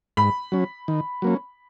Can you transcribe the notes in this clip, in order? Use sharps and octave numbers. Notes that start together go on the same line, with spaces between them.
G#2 B5
F#3 C#4
D#3
F#3 A#3 C#4